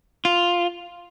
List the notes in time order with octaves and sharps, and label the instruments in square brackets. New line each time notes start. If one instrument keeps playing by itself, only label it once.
[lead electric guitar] F4